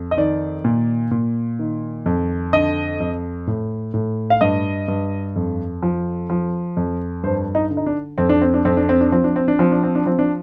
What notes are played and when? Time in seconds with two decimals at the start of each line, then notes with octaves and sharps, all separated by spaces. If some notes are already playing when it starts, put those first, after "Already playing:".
Already playing: F2
0.11 D#5
0.17 D#3 D5
0.64 A#2
1.11 A#2
1.59 D#3
2.06 F2
2.53 D3 D#5
3.00 F2
3.47 A2
3.94 A2
4.30 F5
4.41 G2 D#5
4.88 G2
5.36 F2
5.83 F3
6.30 F3
6.77 F2
7.24 G2 C5
7.55 D#4
7.71 D3
7.77 D#4
7.86 D4
8.18 F2 C4
8.29 D4
8.41 C4
8.54 D4
8.65 F2 C4
8.77 D4
8.89 C4
9.01 D4
9.12 F3 C4
9.24 D4
9.36 C4
9.48 D4
9.59 F3 C4
9.72 D4
9.83 C4
9.95 D4
10.06 F3 C4
10.19 D4